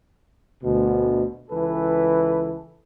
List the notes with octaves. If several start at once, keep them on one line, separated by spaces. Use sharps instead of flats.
D2 B2
C#2 E3 A4 B4